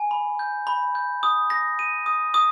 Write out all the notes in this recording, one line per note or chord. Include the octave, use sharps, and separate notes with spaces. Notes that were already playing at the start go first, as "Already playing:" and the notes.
Already playing: G#5
B5
G6
B5
G6
D#6
A#6
D#7
D#6
D#6